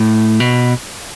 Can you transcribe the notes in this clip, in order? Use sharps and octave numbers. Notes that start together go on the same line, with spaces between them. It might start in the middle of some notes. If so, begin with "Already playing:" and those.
Already playing: A2
B2